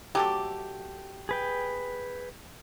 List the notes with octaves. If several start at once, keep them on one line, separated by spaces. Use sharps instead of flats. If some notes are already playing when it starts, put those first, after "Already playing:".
F#3 A3 G4 A4
G#4 B4 G5